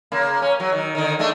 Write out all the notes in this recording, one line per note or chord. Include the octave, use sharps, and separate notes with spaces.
C#3 A#3
C#4
F#3
D#3
D3 D#3
G#3 A3 D4